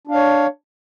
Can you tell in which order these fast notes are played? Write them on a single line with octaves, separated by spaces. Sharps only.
D4 F5 C#5